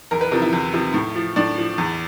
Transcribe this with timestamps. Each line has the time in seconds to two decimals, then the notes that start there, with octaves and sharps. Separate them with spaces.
0.11 E2 A#4
0.21 B4
0.31 C3 F3 A#4
0.42 E4
0.52 E2
0.73 C3 F3
0.94 A2
1.16 F3
1.36 A2 D4
1.58 F3
1.78 E2